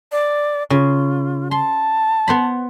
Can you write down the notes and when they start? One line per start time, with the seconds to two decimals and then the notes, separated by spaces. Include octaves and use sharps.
0.12 D5
0.70 C#3 F4
1.51 A5 C6
2.28 B3 C5 B5